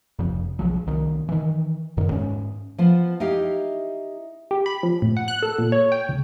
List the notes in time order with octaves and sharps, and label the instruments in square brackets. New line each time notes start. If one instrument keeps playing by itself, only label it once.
[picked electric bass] F1 C2 F2
B1 F3 F#3
C2 D#3
D#3 E3
E1 F#2 D#3
G#2 C#4
[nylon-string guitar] F3 B3 C5
D#4 E4 G4 F5
[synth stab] G4
B5
F3
A2
F#5
F#6
A4
A#2
C#5
G5
C#2